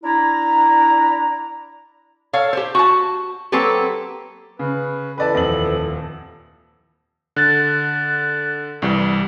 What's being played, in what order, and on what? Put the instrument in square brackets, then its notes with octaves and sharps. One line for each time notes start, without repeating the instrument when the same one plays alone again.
[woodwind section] D4 E4 A#5
[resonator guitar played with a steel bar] A4 C#5 F5
G4 C5
F#4 A5
F#3 A#3 C4 G4 A4 B4
[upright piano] C#3 [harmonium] B4
[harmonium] E3 A4 [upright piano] B4 D5 A5
[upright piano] D#1 F2 F#7
[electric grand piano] D3 [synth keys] F#6 A6
[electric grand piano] C2 E3 G3